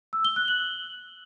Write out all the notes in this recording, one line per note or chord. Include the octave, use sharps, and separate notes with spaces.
E6
G7
F#6
F#7